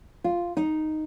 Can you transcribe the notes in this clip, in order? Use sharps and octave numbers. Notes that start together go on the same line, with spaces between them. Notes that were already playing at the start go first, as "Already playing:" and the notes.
F4
D#4